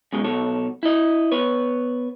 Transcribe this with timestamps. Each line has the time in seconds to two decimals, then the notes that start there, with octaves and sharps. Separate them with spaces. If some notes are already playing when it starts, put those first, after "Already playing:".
0.13 F#2 B2 G#3
0.24 B2 F#3 A4 C#5
0.83 E4 D#5
1.32 B3 B4 C#5